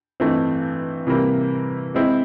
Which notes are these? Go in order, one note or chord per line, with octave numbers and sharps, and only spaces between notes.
G2 E3 A3 C4 D#4
C3 E3 G3 A#3
G#3 C4 E4